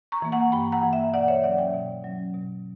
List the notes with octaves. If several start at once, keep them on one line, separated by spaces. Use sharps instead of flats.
A#5 C#6
E3 A#3
F#5 A#5
G2 G5 B5
F#5 A#5
E3 A#3
E5 G5
B2 D5 F#5
C#5 E5
F#3 C#4 D5 F#5
E5 G5
B2
F#3 C#4
B2